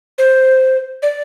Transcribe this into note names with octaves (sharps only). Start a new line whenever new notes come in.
C5
D5